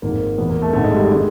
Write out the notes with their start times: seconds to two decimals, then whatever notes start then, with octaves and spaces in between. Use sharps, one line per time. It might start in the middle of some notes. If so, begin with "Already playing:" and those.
0.02 G#1 G#2 F3 A#3
0.38 E2 B2 B3
0.49 A#3
0.62 A3
0.73 G#1 G#2 D#3 A3
0.84 G#3
0.94 G3
1.05 G#3
1.12 D#3